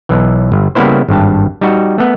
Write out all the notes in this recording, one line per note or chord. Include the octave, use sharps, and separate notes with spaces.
B1 E3
G1
C#3 G3 A#3 B3 E4 C5
G#1 G2 A5
G3 D#4 F#4
A3 B3